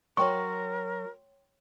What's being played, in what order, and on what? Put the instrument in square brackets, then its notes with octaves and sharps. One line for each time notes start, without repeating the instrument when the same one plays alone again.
[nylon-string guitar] F#3 [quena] A#4 [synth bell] C#5 G5 C6 [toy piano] C#6